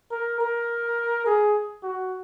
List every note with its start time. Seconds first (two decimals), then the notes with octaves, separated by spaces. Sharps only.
0.11 A#4
0.41 A#4
1.26 G#4
1.83 F#4